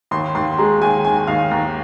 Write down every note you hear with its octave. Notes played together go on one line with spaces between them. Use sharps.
D#2 C6
D#2 C6
G#3 A#5
D#2 G#5
D#3 G#5
D#2 F5
D#2 A#5